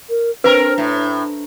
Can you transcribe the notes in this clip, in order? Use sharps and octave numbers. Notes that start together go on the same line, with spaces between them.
A#4
C4 D4 A#4 B4
A2